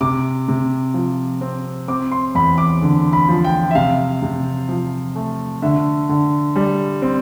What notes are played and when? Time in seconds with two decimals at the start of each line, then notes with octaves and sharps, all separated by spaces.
0.01 C3 D6
0.48 C3
0.94 F3
1.41 C4
1.88 C4 D6
2.11 C6
2.35 E2 B5
2.58 D6
2.82 D3
3.13 B5
3.29 F3
3.44 G5
3.71 E5
3.75 C3 F5
4.22 C3
4.69 F3
5.16 A3
5.62 D3 E5
6.09 D3
6.56 G3
7.02 C4